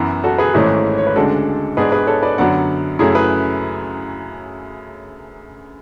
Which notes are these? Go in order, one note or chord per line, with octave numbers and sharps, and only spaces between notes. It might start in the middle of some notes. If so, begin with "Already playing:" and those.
Already playing: F#2 E3 B3
F#4 A4
G#4 B4
G#1 G#2 E3 A3 C#4 E4 G#4
C#5
B4
D2 C#3 G#3 D4 F#4 A4
G#2 G#3 B3 D4 G#4 B4
G#4 B4
A4 C#5
B4 D5
F#2 D3 F#3 B3 D5 F#5
F#2 C#3 F#3 A3 E4 G#4
G#4 B4